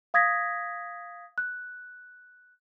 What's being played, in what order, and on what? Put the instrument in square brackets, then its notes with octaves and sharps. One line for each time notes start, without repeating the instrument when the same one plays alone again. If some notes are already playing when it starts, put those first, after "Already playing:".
[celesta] F5 D#6 G#6 A#6 B6
F#6